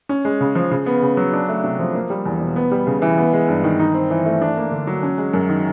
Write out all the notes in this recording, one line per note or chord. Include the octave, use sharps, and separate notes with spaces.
C#4
G#3
C#3
F3
C#3
B3
C#3
F#3
D4
A3
C3
F3
A#3
G3
E2
B2
B3
G3
C#3
E3
B3
G#3
G2
D#3
D#4
C4
E3
A3
D4
A#3
D3
F#3
C#4
G#3
F#2
D#3